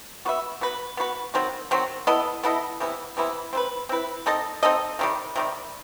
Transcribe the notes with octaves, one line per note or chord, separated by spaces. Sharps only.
B3 F#4 B4 E5
B3 F#4 B4
B3 F#4 B4
D#3 F#3 C4 F#4
D#3 F#3 C4 F#4
B3 E4 A4 D#5
B3 E4 A4 D#5
C3 E3 B3 E4
C3 E3 B3 E4
C4 E4 B4
C4 E4 B4
C4 D#4 A4 D#5
C4 D#4 A4 D#5
C3 D#3 G3
C3 D#3 G3